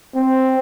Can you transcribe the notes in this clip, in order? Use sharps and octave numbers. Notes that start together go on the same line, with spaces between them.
C4